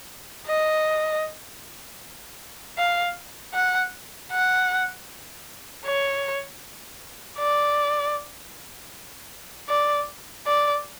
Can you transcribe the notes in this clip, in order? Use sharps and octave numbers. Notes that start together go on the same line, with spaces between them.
D#5
F5
F#5
F#5
C#5
D5
D5
D5